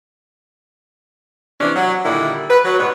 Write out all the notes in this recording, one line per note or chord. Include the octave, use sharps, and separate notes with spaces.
C3 E3 C#4 D4
F#3
A#2 D3 D#3 G3 E4
B4
F#3
G#2 B2 G3 B3 C#5